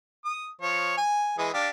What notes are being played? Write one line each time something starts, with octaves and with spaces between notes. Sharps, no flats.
D#6
F3 C#5
G#5
E3 G#3 D#6
D4 G4 F5